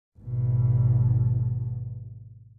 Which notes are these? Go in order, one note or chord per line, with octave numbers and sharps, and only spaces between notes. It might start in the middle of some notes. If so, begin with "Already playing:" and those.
G#1 B2